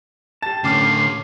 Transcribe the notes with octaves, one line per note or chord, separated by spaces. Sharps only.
G4 A5 A6
A2 D3 C#4 D6 F6 C7